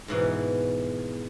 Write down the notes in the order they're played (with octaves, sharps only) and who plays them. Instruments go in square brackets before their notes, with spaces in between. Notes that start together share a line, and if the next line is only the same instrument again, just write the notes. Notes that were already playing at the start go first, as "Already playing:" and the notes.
[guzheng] G#2 B2 E3